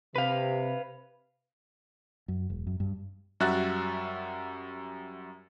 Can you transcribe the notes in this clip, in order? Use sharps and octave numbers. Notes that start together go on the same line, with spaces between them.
C3 B4 F5
F#2
E1
F#2
G2
F#2 G3 F#4 E5 F#6 A6